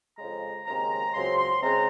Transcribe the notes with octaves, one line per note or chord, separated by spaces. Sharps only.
F2 C#3 G#3 A#5
D#2 C#3 G#3 C4 A#5
C#2 C#3 F#3 C4 C6
C6
C#3 G#3 C4 A#5